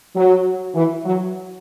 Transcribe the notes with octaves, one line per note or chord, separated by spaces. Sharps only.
F#3
E3
F#3